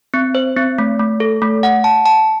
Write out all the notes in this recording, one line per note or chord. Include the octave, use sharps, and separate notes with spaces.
C4
C5
C4
A3
A3
A4
A3
F#5
A5
A5